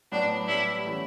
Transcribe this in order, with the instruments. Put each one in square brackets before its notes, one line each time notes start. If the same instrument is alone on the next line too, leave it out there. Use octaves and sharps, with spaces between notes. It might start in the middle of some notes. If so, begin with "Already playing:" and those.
[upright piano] A2 F#3 B3 F#4 [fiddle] D4
[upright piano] A2 G3 B3 [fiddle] E4
[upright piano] E3 A3 C#4 E4